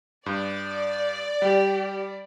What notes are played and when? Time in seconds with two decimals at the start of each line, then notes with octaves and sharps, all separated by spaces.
0.26 G2 D5
1.42 G3 G4